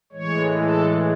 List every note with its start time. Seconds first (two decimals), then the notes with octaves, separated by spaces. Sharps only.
0.12 A2 E3 G#3 C#5
0.55 A4